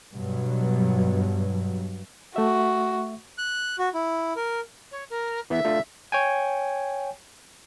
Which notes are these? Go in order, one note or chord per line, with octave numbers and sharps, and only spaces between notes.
G2 B2 F#3
A3 F#4 E5
F#6
F#4
E4
A#4
C#5
A#4
E3 B3 E5
A3 D4 F4
C#5 G5 G#5